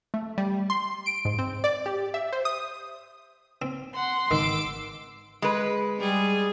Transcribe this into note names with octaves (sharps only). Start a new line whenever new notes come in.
A3
G3
C6
D7
G#2
C4
D5
G4
E5
C5
D#6
C4
F#5 C6
G#1 D#3 D6 E6
G#3 B4
G3 G#4